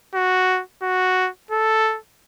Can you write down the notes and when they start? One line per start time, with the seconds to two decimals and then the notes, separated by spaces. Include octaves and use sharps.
0.14 F#4
0.82 F#4
1.50 A4